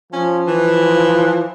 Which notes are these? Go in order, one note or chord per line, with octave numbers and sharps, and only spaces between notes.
F3 C#4
E3